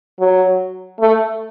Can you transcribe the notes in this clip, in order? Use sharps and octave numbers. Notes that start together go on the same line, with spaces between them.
F#3
A3